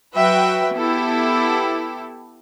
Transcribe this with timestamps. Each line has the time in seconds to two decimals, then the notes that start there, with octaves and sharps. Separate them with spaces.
0.16 F#3 F#4 B4 E5 G5
0.75 B3 E4 G4 A4